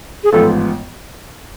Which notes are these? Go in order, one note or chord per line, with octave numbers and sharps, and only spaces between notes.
G#4
A1 G#2 F3 B3 F4 A4